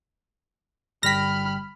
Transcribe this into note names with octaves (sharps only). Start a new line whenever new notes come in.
G1 G3 G5 B5 F6 A#6 B6